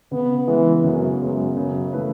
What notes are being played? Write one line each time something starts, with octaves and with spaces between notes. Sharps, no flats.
C#3 B3
E3 G#3 B3
F#2 C#3
F#2 G#3 B3
F#2 C#3
E3 A3 E4 B4